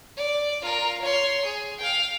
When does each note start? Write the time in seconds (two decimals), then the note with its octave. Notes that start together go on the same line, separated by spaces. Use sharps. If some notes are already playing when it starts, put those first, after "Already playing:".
0.17 D5
0.62 F4 A#4
1.01 C#5 C6
1.44 G#4
1.78 F5 G5